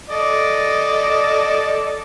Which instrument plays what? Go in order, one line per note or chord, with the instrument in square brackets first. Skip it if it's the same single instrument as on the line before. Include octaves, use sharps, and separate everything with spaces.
[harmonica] A4 D5 D#5